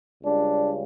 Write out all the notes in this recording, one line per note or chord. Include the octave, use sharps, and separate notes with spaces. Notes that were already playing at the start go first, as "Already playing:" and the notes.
C#2 C#3 G3 D4